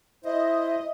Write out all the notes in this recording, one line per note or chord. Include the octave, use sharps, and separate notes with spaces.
E4 C5 D#5 E5